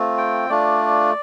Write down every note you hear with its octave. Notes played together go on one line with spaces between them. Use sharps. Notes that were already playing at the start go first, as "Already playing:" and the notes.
Already playing: A3 C4 F4
G5
A3 D4 F4 D5